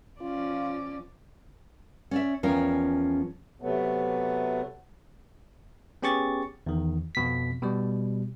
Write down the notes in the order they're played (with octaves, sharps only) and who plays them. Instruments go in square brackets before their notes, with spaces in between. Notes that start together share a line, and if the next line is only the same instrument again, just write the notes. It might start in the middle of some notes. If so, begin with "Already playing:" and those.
[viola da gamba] F3 C#4 D5 [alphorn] F4
[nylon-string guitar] C#4 D5 E5
E2 F3 C#4 A#4 G5
[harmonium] C3 F#3 A3 B3
[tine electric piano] B3 C#4 G4 G#4 C#6 A6
E2 D#3
F2 B2 B6
B2 G3